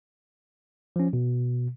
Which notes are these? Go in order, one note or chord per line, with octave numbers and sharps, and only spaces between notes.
F3 C#4
B2